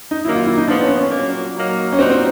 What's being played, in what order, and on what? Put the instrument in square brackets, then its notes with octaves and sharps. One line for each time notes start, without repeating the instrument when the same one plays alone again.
[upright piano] D#4
[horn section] D#3 F#3 A#3 [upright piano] E4
[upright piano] F4
E4
D#4
[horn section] A#2 F3 G#3 B3 [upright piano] D4
[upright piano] C#4
C#4
[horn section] A#2 F#3 A#3
F#3 A#3 D#4
[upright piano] C#4
[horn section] A#2 G3 A#3 D#4 F#4 [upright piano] C4
[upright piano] C4